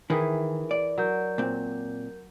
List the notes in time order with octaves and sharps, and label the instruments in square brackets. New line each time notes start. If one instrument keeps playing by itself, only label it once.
[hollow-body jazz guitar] D#3 E4 [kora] E3 G#4 [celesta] A#4
[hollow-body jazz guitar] D5
[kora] F#3 [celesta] A#4 G6
[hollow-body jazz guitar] A#2 C4